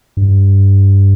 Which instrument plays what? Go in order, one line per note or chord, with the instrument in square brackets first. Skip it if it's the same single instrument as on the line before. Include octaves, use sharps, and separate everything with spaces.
[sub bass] G2